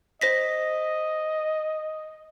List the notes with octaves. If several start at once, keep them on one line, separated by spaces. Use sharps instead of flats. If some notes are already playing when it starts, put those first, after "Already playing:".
C5 D#5 A#6 B6